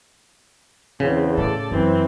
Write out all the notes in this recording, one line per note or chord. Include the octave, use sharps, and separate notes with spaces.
E2 C#3 C4
A2 A4 D5
F#2 E3 C4